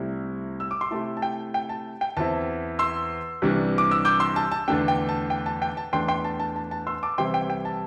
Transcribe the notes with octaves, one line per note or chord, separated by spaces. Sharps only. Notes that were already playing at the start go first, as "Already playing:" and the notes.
Already playing: C2 C3 A3 E4
E6
D6
C6
C3 A3 E4 A5
A5
G5
G5
A5
G5
E2 E3 C4 E4 A5
C6 E6
C2 C3 E3 G3 D4
D6
E6
D6 G6
C6 E6
A5
A5
E2 D3 A3 D4 G5
G5
A5
G5
A5
G5
A5
E2 E3 A3 D4 G5 C6
G5 C6
A5
A5
A5
A5
C6 E6
A5 D6
C2 C3 E3 C4 E4 G5 C6
G5
G5
A5